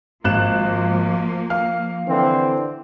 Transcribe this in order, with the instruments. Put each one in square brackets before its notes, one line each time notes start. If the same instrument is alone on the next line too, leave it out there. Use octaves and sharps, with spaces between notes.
[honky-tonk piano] G#1 F#6 E7 [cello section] F3 A#3
[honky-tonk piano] F5 F6
[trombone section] D3 E3 C4